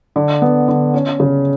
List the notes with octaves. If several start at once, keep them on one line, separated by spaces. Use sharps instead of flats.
D3
B3
D3
C#4
C#3